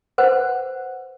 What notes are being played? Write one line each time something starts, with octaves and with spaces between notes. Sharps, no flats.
B4 C5 F#5